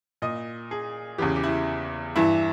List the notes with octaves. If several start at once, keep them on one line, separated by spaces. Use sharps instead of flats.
A#2 D#5
G#4
E2 C#3 E3 G4
G4
E4
G2 E3 E4